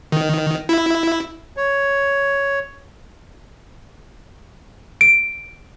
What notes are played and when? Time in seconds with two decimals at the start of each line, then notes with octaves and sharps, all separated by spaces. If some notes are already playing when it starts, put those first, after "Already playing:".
0.12 D#3
0.69 E4
1.57 C#5
5.01 D7